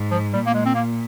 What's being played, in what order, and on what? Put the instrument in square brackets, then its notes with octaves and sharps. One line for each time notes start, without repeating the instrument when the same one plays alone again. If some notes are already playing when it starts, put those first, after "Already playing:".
Already playing: [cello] G#2
[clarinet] F3
[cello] A#2 [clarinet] G3
[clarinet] A#3
G#3
C4
A#3